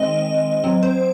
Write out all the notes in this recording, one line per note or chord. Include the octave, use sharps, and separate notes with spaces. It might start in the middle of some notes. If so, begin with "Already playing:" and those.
Already playing: D#3 G#3 C4 D#5
F#3 C4
C5